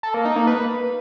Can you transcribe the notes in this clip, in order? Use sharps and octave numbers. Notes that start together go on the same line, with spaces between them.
A4
A#3
D#4
A#3
B4